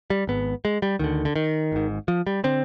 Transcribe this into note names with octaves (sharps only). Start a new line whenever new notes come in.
G3
G#1 G#2 B3
G#3
G3
D2 D3 D#3
D3
D#3
G#1 G#2
F3
G3
D3 C4